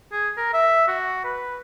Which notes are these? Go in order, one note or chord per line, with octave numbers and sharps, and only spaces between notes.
G#4
A#4
E5
F#4
B4